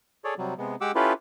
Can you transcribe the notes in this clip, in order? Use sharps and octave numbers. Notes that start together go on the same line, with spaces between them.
G#4 A4 C#5 D5
C3 F#3 G3
C3 G#3 B3
G#3 G4 F#5 D6 E6
C#4 E4 F4 G4 A4 B4